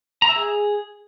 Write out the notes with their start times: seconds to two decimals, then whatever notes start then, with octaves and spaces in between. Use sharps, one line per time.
0.22 A#5
0.29 E5
0.36 G#4